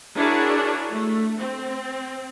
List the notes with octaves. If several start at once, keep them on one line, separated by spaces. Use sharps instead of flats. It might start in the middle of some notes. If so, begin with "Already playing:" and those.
D4 E4 F#4 G#4 A#4 C#5
A3
C4